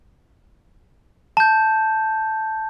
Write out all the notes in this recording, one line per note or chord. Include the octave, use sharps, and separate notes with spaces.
A5 G6